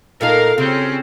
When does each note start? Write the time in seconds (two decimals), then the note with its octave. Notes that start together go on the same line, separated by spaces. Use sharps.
0.21 A#2 A3 D#4 A#4 F5
0.58 C#3 G3 C4 C#4